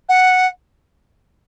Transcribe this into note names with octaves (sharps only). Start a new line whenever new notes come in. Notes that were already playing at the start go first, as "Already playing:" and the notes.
F#5